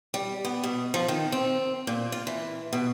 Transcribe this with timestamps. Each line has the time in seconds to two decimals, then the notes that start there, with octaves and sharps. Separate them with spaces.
0.14 G3
0.45 B3
0.64 B2
0.94 F3
1.08 D#3
1.32 C4
1.87 A#2
2.12 F4
2.27 E3
2.73 B2